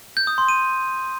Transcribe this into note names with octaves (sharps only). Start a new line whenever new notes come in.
G6
D#6
C6
D#7